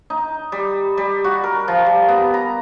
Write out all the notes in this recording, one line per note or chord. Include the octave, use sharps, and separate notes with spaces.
D#4
G3
G3
F#4
A#4
F3
G3
B3
A#5